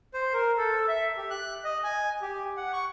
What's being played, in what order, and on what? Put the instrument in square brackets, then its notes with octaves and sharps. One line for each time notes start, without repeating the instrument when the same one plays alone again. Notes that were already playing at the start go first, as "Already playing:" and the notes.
[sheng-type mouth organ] C5
A#4
A4
E5
G4
F#6
D#5
G#5
G4
F#5
C#6